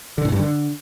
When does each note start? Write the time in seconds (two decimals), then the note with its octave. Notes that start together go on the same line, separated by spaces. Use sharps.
0.18 D3
0.25 A2
0.32 G2
0.39 D3